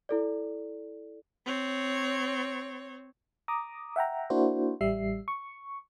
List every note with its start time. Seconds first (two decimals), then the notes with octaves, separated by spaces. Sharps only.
0.09 E4 A4 D5
1.46 C4 C#5
3.48 A#5 D6 D#6
3.96 E5 F#5 G5 A#5
4.30 A#3 D4 E4 F#4 C5
4.81 A1 G3 E5 C7
5.28 C#6